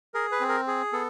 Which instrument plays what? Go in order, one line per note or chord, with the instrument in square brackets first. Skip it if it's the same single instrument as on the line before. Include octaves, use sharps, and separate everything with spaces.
[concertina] G#4 A#4
B4
C4
A#4
G#4
B3 A4